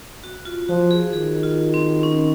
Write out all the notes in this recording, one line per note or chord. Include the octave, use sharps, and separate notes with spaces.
F#4
F4
F3 F#4
G#4
D#3 G#4
F4
C4
C#4